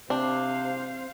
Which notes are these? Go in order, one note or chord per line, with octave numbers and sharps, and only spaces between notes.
C3 C4 D4 C5 F5